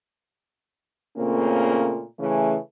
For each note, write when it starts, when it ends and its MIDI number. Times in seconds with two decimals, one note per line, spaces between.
1.17 2.03 46
1.17 2.03 49
1.17 2.03 57
1.17 2.03 58
1.17 2.03 60
1.17 2.03 61
2.19 2.55 49
2.19 2.55 52
2.19 2.55 57